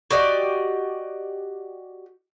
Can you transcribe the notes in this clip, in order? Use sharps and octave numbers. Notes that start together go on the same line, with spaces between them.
F#4 G4 D5 D#5